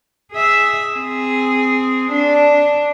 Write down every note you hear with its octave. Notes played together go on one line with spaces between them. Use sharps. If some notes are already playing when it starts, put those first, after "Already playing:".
G#4 E5
C4 G#4
D4